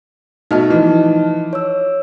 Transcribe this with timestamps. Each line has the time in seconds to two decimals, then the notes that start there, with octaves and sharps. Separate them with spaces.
0.51 B2 A3 D#4 D#5 A5 F6
0.70 E3 F3
1.53 C#5 E6